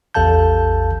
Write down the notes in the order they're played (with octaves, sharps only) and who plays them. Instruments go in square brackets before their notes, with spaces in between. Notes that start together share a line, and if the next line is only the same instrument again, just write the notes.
[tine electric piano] A1 E2 A4 F5 A5 G6